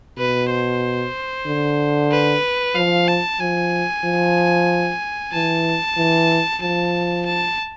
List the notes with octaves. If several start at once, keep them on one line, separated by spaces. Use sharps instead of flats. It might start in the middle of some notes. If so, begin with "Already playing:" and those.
B2 B4
C5
D3
B4
F3 F5
A5
F3 G#5
F3
E3 A5
E3
F3 A5
A5